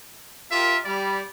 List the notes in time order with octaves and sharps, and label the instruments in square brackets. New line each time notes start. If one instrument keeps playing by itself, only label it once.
[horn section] F4 G4 A#4 [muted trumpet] E5
[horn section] G3 B5 [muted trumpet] D5